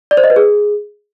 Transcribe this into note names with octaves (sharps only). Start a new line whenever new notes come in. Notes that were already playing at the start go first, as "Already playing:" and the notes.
D5
C5
D#5
B4
G#4